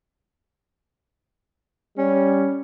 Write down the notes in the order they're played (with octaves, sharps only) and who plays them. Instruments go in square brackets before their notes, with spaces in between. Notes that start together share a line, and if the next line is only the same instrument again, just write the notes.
[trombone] G3 [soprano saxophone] C#4